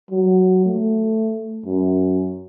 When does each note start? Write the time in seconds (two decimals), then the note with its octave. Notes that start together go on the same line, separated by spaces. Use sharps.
0.11 F#3
0.66 A3
1.66 F#2